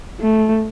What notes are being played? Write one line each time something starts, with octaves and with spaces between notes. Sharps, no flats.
A3